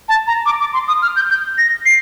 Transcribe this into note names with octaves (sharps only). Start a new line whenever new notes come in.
A5
A#5
D6
D6
C6
D#6
F6
G6
G6
A#6
C7